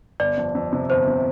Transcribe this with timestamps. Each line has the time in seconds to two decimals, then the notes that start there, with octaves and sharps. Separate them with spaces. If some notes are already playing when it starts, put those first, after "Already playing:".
0.20 G1 D5
0.37 F2
0.55 F2
0.73 C3
0.90 G1 C5
1.08 C3